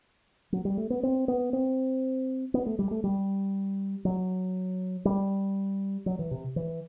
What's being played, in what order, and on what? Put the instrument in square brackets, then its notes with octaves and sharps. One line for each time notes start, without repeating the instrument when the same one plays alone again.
[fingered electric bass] F#3
G3
A3
B3
C4
B3
C4
B3
A3
G3
A3
G3
F#3
G3
F#3
E3
C3
E3